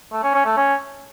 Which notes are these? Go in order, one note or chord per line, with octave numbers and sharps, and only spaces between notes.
A3
C#4
C#4
A3
C#4